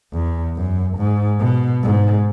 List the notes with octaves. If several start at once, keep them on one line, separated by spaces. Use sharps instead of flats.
E2
F#2
G#2
B2
G#2